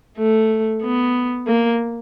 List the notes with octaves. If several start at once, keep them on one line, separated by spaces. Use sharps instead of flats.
A3
B3
A#3